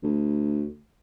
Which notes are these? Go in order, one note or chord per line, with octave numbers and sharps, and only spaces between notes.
D2